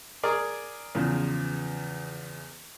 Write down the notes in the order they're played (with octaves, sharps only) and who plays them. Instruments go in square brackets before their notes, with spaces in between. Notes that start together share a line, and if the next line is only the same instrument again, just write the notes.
[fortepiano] G#4 A#4 D5
[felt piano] E2 C#3 F3